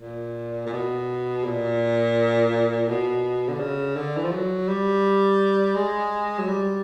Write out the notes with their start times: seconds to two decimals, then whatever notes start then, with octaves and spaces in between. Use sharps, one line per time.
0.01 A#2
0.66 A#2
0.73 B2
1.44 A#2
2.88 B2
3.48 D3
3.59 C#3
3.96 D3
4.17 E3
4.24 F3
4.31 F#3
4.68 G3
5.75 G#3
6.38 F#3
6.47 G3